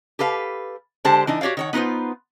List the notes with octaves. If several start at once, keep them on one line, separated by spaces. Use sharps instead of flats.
G4 A4 B4 F5
D3 G#3 G4 C5 A5
E3 D4 D#4
F#4 G4 C#5 D5 F5
D#3 C#5 F#5
B3 D#4 F4 B4 C5